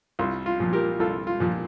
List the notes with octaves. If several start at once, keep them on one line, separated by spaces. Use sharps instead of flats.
C2 F4
F4
A#2 F3
G4 A#4
C2 F4 A4
F4
A#2 F3